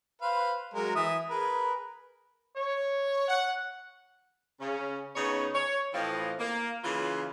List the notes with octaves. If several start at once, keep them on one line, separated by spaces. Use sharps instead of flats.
B4 C5 F5
F#3 G#3 A#4
E3 E5 D#6
G#4 A#4 B4
C#5
F#5
C#3 C#4
C#3 B3 D#4 C#5
C#5
A2 E3 F3 C4 D#5 F5
A#3
C#3 E3 A#3 F4